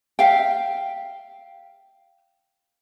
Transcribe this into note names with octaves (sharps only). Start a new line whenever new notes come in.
E5 F5 G5